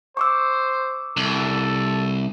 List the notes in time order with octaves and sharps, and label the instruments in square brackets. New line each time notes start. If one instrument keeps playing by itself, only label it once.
[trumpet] C5 [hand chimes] C#6 D6 E6
[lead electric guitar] C2 [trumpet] A4